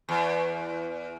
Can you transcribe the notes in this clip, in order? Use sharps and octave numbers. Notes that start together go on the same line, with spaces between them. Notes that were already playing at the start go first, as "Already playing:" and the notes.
E2